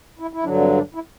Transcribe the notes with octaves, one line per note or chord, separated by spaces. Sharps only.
E4
E4
G2 D3 F#3 D4
C4
D4
E4